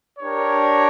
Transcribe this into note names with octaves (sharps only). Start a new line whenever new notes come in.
D4 G4 A#4 C#5